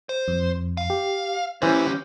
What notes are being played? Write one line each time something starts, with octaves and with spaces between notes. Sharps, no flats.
C5
F2
F5
G4
E3 C#4 G4 C5 C#5 F6 G6